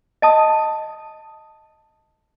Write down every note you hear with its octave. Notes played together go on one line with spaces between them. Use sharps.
D#5 A5 D#6